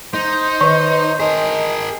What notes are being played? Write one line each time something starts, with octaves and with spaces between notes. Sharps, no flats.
D#4 C5
D#3 B4
G#4 A#4 D#5